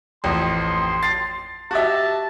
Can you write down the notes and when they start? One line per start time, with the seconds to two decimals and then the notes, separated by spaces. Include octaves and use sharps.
0.24 A1 F2 C6
1.02 A6 C7
1.71 F#4 G4 E5 A5